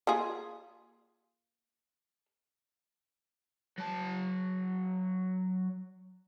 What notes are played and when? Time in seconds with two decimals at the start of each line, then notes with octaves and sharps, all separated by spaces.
0.07 A#3 F4 G#4
3.78 F#3 A5